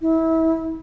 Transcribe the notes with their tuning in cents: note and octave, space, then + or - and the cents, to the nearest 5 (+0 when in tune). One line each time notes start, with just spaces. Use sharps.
E4 -25